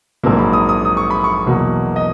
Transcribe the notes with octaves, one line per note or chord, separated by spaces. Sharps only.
A#1 G#2 F#3 A#3
B5
D#6
D#6
D#6
C#6
B5
C#6
E2 B2 F#3 A#3
D#5